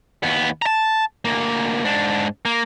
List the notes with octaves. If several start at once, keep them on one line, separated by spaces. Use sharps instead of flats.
D#2 B3
A5 A#5
D2 A#3
G#2 D4
A#3